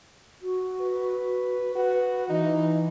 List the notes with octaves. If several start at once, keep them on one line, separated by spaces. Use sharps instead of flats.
F#4
B4
F#4 B4
E3 D#4